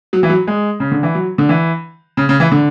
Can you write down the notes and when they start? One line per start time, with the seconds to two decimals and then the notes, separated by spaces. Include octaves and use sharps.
0.13 F#3
0.23 E3
0.29 F#3
0.47 G#3
0.80 C#3
0.92 D3
1.03 E3
1.15 F#3
1.38 D3
1.49 E3
2.17 C#3
2.29 C#3
2.40 E3
2.52 D3